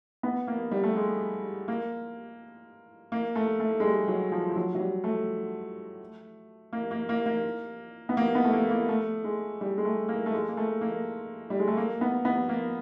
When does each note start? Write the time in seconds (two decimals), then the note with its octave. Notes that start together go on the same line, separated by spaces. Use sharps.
0.23 B3
0.47 A#3
0.71 G3
0.83 A3
0.96 G#3
1.68 A#3
3.12 A#3
3.35 A3
3.60 A3
3.80 G#3
3.84 G3
4.08 F#3
4.32 F3
4.50 F3
4.56 F#3
4.75 F#3
4.80 G3
5.04 A3
6.73 A#3
6.91 A#3
7.09 A#3
7.26 A#3
8.09 B3
8.17 A#3
8.35 B3
8.44 A3
8.53 A#3
8.71 A#3
8.89 A3
9.24 G#3
9.61 G3
9.78 G#3
9.85 A3
10.09 A#3
10.26 A3
10.33 G#3
10.48 A#3
10.57 A3
10.81 A#3
11.50 G3
11.60 G#3
11.68 A3
11.77 A#3
12.01 B3
12.25 B3
12.49 A#3